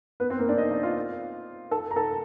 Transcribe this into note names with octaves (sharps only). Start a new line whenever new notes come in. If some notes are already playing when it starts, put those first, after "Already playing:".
B3 B4
C4 C5
A#3 A#4
D4 D5
D#4 D#5
D#4 D#5
F4 F5
A4 A5
A#5
A4 A5